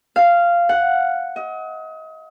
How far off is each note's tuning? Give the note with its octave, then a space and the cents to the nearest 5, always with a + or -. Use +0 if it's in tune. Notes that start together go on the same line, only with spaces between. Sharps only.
F5 -10
F#5 +0
D#5 +35